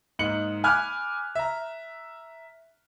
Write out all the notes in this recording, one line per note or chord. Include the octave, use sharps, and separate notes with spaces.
G#2 A#3 D#4 C#7 F#7
G#5 B5 D6 F6 F#6 G#6
E5 A#5